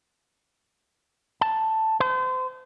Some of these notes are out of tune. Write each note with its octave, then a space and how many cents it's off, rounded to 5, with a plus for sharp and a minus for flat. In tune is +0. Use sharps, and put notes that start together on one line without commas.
A5 +5
C5 -35